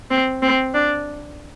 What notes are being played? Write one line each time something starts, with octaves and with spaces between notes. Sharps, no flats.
C4
C4
D4